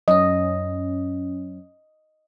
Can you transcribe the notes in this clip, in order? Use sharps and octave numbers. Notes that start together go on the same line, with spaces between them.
F#2 C#4 D#5